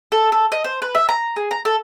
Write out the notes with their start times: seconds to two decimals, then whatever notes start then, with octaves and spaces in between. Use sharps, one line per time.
0.12 A4
0.32 A4
0.52 D#5
0.64 C5
0.82 B4
0.95 E5
1.09 A#5
1.36 G#4
1.51 A#5
1.65 A4